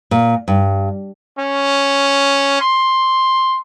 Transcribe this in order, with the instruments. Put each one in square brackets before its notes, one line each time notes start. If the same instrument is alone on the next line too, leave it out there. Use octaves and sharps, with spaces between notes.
[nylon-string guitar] A#2
G2
[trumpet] C#4
C6